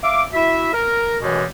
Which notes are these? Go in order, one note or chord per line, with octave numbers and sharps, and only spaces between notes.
E5 F5 D6
E4 F#4 E5
A#4
F#2 B2 E3 G3 G#3